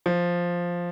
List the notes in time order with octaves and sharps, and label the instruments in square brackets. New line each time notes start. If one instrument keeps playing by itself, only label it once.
[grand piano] F3